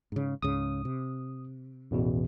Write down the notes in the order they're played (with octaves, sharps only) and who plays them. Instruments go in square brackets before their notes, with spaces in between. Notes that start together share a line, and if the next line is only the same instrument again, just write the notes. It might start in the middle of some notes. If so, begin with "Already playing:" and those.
[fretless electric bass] G#2 C#3
[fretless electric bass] C#2 G#2 C#3 [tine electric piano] D#6
[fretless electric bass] C3
[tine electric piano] A1 E2 B2